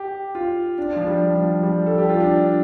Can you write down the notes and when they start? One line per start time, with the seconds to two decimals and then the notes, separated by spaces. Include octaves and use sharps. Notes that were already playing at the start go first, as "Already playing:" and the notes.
Already playing: G4
0.35 F4
0.78 D4
0.96 F3
1.07 G3
1.36 F3
1.63 G3
1.86 A4
1.98 G4
2.09 F4
2.20 D4